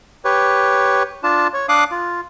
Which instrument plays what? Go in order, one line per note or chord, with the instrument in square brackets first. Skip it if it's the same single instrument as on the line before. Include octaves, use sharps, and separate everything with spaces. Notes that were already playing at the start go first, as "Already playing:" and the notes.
[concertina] G4 B4 C#5
D4 F4 A5
C#5
D4 F5 D6 D#6 F#6
F4